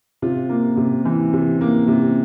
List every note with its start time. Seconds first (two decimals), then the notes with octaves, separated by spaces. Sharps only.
0.22 C3 F4
0.49 A#3
0.77 C3
1.05 E3
1.33 C3
1.61 A#3
1.88 C3